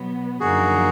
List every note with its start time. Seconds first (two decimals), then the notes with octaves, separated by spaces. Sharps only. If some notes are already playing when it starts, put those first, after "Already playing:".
Already playing: B2 F#3 B3
0.40 F#2 D3 F3 A#3 D#4 F#4 G#4